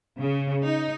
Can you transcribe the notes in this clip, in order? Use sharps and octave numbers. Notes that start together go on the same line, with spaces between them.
C#3
D#4